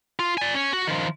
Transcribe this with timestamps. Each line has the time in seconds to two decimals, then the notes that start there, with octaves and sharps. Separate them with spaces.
0.19 F4
0.38 D5 G#5
0.55 C#4 C#5
0.73 F#4
0.87 D#3 F3